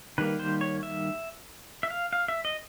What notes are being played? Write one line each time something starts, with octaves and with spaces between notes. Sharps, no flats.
D#3 G3 A#3 B4
C5
C#5
E5
E5
F5
F5
E5
D#5